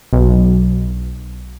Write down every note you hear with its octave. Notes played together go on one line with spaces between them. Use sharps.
B1